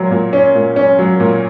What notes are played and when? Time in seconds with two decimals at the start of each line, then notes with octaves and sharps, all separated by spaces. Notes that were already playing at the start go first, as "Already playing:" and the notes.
Already playing: A#2 F#3
0.11 A#2
0.33 C#4
0.55 A#2
0.76 C#4
0.99 F#3
1.20 A#2